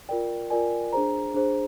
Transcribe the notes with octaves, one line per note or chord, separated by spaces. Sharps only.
F4 A#4 D5 G5
F4 A#4 D5 G#5
D4 G#4 C5 A#5
D4 G#4 C5